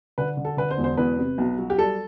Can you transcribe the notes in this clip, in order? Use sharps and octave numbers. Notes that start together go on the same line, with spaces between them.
D3 B4
D3
A4
D3 B4
C5
E1
C5
E2 B4
C3
B1
F#3
G4
G3 A4